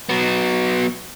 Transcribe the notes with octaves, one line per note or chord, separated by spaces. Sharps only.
F#3 B3